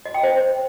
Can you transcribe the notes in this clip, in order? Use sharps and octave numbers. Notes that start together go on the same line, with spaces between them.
D#5
G5
C5